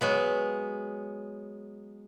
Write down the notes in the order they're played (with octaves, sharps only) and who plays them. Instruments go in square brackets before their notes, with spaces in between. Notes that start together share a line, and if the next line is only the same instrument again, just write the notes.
[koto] F#3 G#3 B3